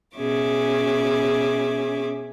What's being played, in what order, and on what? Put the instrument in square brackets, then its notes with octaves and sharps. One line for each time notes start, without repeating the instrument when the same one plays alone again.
[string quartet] B2 C#4 G#4 E5 D6